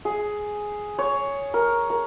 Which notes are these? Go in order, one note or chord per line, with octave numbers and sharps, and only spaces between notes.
G#4
C#5
A#4
A#4